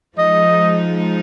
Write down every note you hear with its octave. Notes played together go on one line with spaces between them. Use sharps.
F3 G#3 D#4 D#5